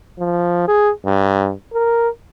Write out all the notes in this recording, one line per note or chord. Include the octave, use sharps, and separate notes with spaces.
F3
G#4
G2
A#4